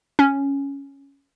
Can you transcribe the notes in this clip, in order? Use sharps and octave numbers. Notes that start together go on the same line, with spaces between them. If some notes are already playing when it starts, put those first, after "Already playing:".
C#4